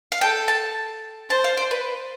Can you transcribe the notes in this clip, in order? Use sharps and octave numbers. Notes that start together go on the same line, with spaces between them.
F5
A4 G5
A5
C5 A5
F5
D5
B4